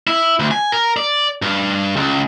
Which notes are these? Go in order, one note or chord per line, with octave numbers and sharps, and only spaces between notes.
E4
D2
G#5
A#4
D5
G2
C#2